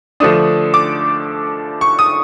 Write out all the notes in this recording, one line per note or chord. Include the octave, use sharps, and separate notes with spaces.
D3 F3 A3 D4 D#6
D6
C#6
D#6